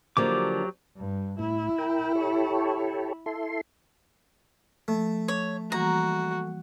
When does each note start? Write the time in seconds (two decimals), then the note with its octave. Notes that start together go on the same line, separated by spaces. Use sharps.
0.17 D3 F3 F#3 A#3 G4 D6
0.97 G2
1.39 A2 E4
1.78 A#4 G5
2.15 G4 A4 C#5
3.26 E4 A4 C6
4.88 F3 A3
5.28 C#5
5.72 E3 G3 A#3 F#4 A#5